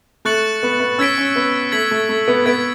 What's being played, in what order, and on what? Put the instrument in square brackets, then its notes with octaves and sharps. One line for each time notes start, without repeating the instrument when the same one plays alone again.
[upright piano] A3 [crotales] C#6 F#6 A6 C#7 F#7
[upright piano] B3
B3
[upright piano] C#4 [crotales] E6 G#6 B6 D7
[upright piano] C#4
B3
[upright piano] A3 [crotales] G#6 B6 F#7
[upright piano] A3
A3
B3
[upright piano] B3 [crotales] G#6 B6 D7